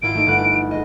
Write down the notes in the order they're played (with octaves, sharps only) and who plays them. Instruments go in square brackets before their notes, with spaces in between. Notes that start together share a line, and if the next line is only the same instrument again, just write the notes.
[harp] G#1 E4 F4 [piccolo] D7
[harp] A3 D#4
G1 F#6
G#3 D#5